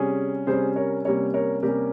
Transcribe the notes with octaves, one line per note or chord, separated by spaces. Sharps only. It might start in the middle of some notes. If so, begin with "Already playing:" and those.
Already playing: C3 G3 C#4 G#4
C3 G3 C#4 G#4 C5
A#4 C#5
C3 G3 A#3 C#4 A#4 C#5
A#4 C#5
C3 G3 A#3 C#4 G4 A#4